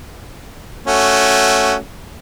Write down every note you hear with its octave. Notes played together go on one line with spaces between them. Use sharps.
A3 C#4 F#4